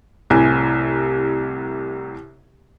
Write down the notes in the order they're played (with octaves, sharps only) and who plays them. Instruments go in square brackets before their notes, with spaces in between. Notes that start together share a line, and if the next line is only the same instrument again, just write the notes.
[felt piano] C2 A2 C3 G#5